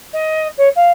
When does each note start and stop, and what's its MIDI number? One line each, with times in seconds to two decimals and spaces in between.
0.13 0.47 75
0.57 0.68 73
0.75 0.91 77